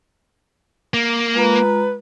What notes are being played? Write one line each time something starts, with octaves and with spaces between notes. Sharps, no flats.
A#3
G#3 F4 B4 A#5